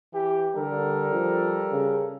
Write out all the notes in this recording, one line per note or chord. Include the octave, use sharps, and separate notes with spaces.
E3 G4
D3 G3 A4 A#4
F3
C#3